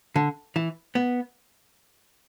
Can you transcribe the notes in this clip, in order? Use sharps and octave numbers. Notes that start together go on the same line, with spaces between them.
D3
E3
B3